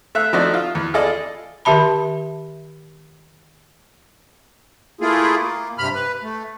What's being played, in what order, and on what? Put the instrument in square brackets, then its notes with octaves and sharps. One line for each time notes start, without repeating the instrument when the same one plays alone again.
[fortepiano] A3 E5 F5 F#6
F3 A3 D#4 F#4 D5
F4
E2
F4 G#4 A4 D5 D#5
[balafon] D#3 G4 E5 A5 B5
[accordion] A3 A#3 E4 F4 G#4
A#3
G2 C3 B5 F6
B4
A3